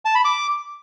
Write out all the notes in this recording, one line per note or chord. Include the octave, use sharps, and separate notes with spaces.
A5
B5
D6